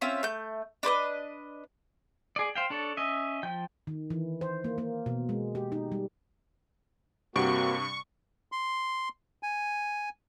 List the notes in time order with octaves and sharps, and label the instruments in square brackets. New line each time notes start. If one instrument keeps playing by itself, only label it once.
[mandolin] C4 C#4 F4 E5
A3 G6
D4 B4 C5 D#5
[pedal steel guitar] G#4 D5
C5 F5 G5
D4 A4 C#5
C#4 D#5 E5
F3 G5 G6
[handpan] D#3
E3
C5
A#3
A#3
B2
G#3
G4
D#4
G3
[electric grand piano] G2 C3 D7 [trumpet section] A#3 C4 F#4 [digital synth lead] C#6
[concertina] C6
G#5